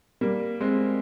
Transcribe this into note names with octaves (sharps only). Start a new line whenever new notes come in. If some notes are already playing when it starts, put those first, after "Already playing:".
G3 A#3
G#3 C4